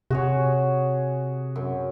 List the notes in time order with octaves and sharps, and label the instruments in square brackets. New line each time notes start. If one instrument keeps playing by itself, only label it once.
[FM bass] C3 [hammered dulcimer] F#4 G#4 C#5
[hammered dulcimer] F#2